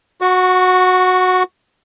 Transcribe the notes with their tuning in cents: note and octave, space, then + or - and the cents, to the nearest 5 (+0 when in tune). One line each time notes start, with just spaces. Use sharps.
F#4 -10 C#6 +15